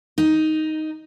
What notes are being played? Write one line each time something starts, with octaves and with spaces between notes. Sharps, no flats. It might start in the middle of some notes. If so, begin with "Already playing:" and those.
D#4